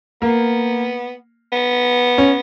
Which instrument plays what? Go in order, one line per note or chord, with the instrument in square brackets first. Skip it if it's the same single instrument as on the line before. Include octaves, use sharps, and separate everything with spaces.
[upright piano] A#3 [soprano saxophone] B3
[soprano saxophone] B3
[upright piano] C#4